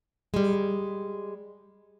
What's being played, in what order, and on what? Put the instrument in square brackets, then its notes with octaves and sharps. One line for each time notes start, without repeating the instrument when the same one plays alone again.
[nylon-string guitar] G3 G#3